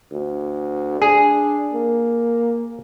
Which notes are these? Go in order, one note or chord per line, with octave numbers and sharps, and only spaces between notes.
D2
D4 G#4
A#3